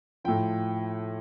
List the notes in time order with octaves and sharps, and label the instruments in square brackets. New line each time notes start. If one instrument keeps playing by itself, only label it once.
[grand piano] A2 F3 G5